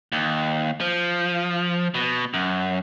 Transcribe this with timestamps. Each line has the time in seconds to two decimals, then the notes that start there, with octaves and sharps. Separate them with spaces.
0.12 D#2
0.81 F3
1.95 B2
2.34 F#2